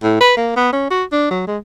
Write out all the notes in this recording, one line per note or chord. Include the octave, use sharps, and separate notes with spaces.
A2
B4
A#3
B3
C#4
F#4
D4
F#3
G#3